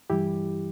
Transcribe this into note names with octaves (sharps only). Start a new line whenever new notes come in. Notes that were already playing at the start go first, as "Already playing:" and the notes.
G2 E3 G3 E4 G4